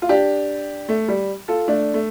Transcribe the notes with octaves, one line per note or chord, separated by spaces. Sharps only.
F4
D4 G4
A3
G3
F4 A4
A3 D4
A3